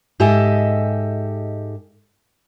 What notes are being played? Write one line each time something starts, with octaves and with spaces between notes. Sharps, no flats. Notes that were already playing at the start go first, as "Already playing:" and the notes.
G#2 G4 A4 D#5 E5 G#5